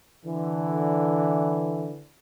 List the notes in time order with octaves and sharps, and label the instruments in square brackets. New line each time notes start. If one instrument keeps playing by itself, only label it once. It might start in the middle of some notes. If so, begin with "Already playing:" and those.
[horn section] D3 E3